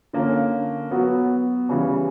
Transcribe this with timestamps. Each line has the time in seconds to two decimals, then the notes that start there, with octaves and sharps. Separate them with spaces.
0.13 D3 A#3 C#4
0.91 F#3 B3 F#4
1.69 C#3 E3 G3